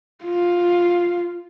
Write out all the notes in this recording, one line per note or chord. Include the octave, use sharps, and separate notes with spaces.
F4